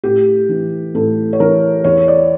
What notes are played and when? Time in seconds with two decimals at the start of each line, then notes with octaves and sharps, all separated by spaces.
0.04 A2 G4
0.49 E3
0.95 A2 A4
1.33 C#5
1.40 E3 A#4
1.84 E2 C#5
2.08 D5